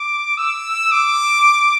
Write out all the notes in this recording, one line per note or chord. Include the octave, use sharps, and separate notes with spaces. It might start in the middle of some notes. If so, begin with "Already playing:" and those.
Already playing: D6
E6
D6